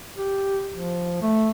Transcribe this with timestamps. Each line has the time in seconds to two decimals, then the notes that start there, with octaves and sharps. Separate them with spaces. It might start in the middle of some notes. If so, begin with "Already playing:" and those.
0.17 G4
0.73 F3
1.22 A3